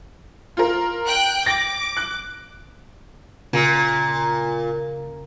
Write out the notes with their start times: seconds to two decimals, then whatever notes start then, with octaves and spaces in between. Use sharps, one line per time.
0.57 F4 A#4
1.07 G5 F#6 D7
1.46 D6 A#6
1.97 F#6
3.53 A#2 C#3